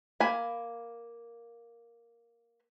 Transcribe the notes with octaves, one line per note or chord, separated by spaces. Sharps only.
A#3 G#5 B5